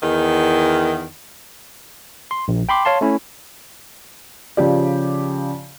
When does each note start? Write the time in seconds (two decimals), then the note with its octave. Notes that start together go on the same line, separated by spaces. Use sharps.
0.02 E2 D#3
2.31 C6
2.48 A#1
2.69 G5 B5 C6 D6
2.85 C#5 F5 A5 C6
3.01 A3 C#4 E4
4.57 C#3 F3 G4 D5